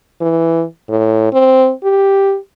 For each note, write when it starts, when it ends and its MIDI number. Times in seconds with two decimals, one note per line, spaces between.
0.21 0.64 52
0.89 1.28 45
1.33 1.72 60
1.84 2.37 67